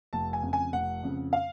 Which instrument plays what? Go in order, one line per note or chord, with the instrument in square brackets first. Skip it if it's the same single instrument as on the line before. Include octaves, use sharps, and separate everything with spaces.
[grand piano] F1 A5
G#5
F2 C#3
G#5
F1 F#5
F2 C#3
F5